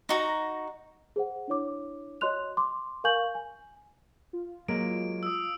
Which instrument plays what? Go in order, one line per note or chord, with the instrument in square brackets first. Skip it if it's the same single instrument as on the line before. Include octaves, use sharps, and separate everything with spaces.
[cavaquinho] D#4 F#4 A#5
[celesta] G#4 C5 F#5
D4 E4 C#5 D6
F#4 C#5 D#5 C6 F#6 F7
C6 D6
A#4 F5 G#5 C#6 G6 F#7
G#5
[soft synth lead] F4
[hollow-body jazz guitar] F#3 G#3 A#3 [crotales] D7
[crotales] D#6 E6